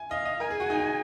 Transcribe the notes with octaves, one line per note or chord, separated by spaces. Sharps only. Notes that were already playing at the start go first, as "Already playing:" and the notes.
Already playing: G#5
D#5 F5
D#5
A#4 G#5
G#4
F#4
D#4
D#4